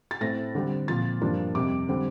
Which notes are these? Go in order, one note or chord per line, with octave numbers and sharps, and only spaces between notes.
A6
A2 A3 C4 A#6
D3 G3 C4
A#2 F3 C4 A6
G2 F3 A#3 D4
F2 C3 G3 D6
D3 G3 C4